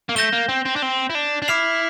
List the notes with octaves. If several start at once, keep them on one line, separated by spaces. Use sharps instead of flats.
A#3
A3 G6 A#6 E7 G7
A#3
C4
C4
D4
C4
E4
D4
D4
E4 D6 F6 C7 F7